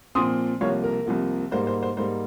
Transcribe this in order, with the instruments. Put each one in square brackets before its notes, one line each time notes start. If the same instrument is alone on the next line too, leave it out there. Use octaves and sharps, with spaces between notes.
[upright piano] A#2 F3 C4 C6 D#6
C2 C3 F3 A#3 C#5 F5
A#4
C2 C3 F3 A#3
G#2 G3 A#3 C5
C5
C5
G#2 G3 A#3 C5